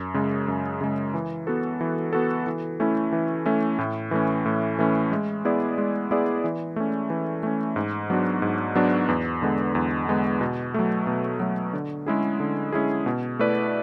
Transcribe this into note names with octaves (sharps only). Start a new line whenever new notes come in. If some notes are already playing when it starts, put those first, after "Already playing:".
Already playing: F#2
C#3 G#3
F#2
C#3 G#3
E3
B3 F#4 A4
E3
B3 F#4 A4
E3
A3 C#4 E4
E3
A3 C#4 E4
A2
E3 A3 C#4
A2
E3 A3 C#4
G#3
B3 E4 G#4 D5
G#3
B3 E4 G#4 D5
E3
A3 C#4
E3
A3 C#4
G#2
F#3 B3 D4 F#4
G#2
F#3 B3 D4 F#4
E2
D3 G#3 B3
E2
D3 G#3 B3
B2
F#3 A3
B2
F#3 A3
D3
G#3 C#4 E4 G#4
D3
G#3 C#4 E4 G#4
B2
A3 E4 B4 D5